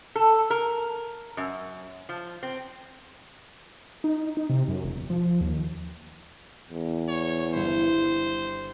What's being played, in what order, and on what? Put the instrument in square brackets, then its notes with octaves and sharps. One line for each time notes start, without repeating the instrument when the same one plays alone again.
[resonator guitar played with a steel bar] A4
A#4
F#2
F3
C4
[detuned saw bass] D#4
D#4
C3
F#2
E1
F3
D#2
[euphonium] E2
[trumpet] C#5
[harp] G1 E4 [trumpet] C5